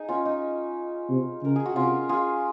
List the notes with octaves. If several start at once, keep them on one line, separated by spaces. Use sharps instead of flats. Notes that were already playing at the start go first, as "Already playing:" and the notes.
Already playing: D#4 G#4
C#4 F4
D#4
C3
C#3 A#4
G#4
F#4
C3 C#4 F4
F4 G#4